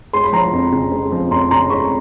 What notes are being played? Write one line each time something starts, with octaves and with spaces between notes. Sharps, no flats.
G#3 C6
B5
F3 A#5 C6
F2
C#3
G#3
F3
F2 A#5 C6
C#3 A#5 C6
G#3 B5 C#6